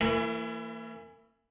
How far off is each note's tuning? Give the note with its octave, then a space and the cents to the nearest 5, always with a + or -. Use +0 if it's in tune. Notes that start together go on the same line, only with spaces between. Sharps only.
E3 +0 A#3 -45 E4 +35